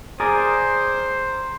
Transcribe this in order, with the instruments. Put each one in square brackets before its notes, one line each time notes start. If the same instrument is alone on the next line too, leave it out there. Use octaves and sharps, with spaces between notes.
[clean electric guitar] G#4 A#4 D5 [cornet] C5